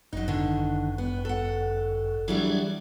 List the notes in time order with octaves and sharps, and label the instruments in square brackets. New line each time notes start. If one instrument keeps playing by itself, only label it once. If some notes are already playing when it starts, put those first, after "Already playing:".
[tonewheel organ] G1 F#2 [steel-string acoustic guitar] F#3 D#4
[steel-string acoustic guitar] D3 D#3
B3
A4 F#5
[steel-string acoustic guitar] E3 F#3 G3 [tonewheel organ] D4 G#4 D5